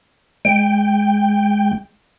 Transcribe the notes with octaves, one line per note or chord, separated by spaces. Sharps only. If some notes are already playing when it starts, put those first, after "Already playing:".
G#3 G5